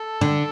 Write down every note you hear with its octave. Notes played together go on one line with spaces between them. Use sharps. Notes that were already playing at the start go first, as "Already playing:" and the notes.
Already playing: A4
D3